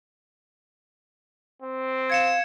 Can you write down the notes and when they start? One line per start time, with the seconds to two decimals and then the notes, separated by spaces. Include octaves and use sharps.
1.62 C4
2.10 F5 G#6 C#7 E7